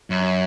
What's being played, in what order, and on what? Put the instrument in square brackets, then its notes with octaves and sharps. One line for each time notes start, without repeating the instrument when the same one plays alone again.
[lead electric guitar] F#2